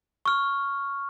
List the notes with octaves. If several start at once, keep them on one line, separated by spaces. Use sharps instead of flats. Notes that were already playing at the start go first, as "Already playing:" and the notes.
C#6 F6